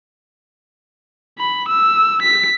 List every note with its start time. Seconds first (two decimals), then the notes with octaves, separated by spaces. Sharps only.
1.39 B5
1.68 E6
2.22 B6